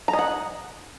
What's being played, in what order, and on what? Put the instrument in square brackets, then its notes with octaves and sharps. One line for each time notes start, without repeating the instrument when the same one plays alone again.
[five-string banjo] A#5
D#5
F#5